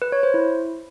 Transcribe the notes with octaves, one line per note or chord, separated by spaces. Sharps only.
B4
C#5
C5
E4